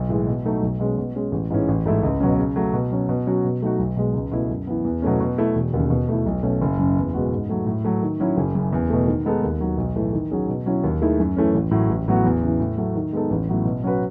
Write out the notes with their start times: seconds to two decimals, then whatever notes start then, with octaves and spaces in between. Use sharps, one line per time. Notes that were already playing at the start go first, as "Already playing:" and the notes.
Already playing: B1
0.09 A2 E3 G#3
0.27 B2
0.45 F#3 A3 D#4 A4
0.63 B1
0.80 B2 G#3 C#4
0.98 B2
1.15 G#3 C#4
1.32 A1
1.50 G#2 E3 G#3 C#4
1.68 A1
1.85 G#2 E3 A3 E4
2.03 C#2
2.20 B2 F#3 C#4
2.38 C#3
2.56 F#3 A3
2.73 B2
2.91 F#3 C#4
3.09 B2
3.27 F#3 C#4 F#4
3.44 B2
3.62 F#3 A3 D#4 F#4
3.79 B1
3.96 B2 G#3
4.14 C#2
4.31 B2 A3 E4
4.50 F#2
4.67 E3 B3
4.85 E2
5.02 B2 F#3 A3 C#4
5.20 B2
5.38 A3 E4
5.55 E1
5.74 D#2 C#3
5.90 B2
6.09 A3 E4
6.26 B1
6.43 B2 A3 C#4
6.61 F#1
6.79 F#2 C#3
6.97 E2
7.14 B2 G#3 B3 F#4
7.32 G#2
7.50 F#3 A3
7.66 A2
7.85 F#3 A3
8.03 D#3
8.20 F#3 C#4 E4
8.37 F#1
8.55 F#2 C#3
8.73 E2
8.90 B2 A3
9.07 D#3
9.26 G#3 B3 D#4 A4
9.43 D#2
9.60 D#3 F#3
9.78 B1
9.96 A2 E3 A3
10.13 D#3
10.31 F#3 C#4 G#4
10.49 B2
10.66 F#3 C#4 E4
10.84 D#2
11.02 D#3 A3 E4 G#4
11.20 F#2
11.37 E3 A3 C#4
11.54 A1
11.71 A2 F#3
11.89 A1
12.08 A2 F#3 B3 F#4
12.25 E2
12.43 C#3 E3
12.60 A2
12.77 F#3 A3
12.95 D#3
13.13 G#3 B3 D#4 A4
13.30 A1
13.49 A2 F#3 B3
13.65 B2
13.83 F#3 C#4 F#4 B4